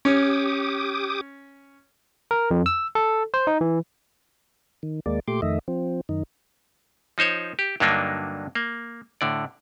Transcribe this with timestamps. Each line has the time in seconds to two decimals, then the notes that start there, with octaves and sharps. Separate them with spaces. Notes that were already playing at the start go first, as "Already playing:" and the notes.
0.05 C#4 G4 D6 D#6
2.31 A#4
2.51 F2
2.66 E6
2.95 A4
3.34 C5
3.47 D#4
3.61 E3
4.83 D#3
5.06 D#2 G#3 A#3 D5
5.28 A#2 A3 G4 C6 D6
5.42 F2 D#3 A3 D#5 E5
5.68 F3 C4
6.09 F#2 D#3 D#4
7.18 F3 D#4 C5 C#5
7.59 G4
7.80 G2 D3 F#3 A#3 D4 D#4
8.55 A#3
9.21 A2 D3 D5